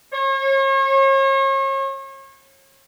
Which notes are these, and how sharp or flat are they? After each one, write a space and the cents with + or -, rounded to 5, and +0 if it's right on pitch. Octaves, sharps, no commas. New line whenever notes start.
C#5 -40